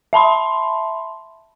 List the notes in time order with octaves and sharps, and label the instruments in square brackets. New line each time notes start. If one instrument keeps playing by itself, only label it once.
[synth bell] E5 A5 B5 C6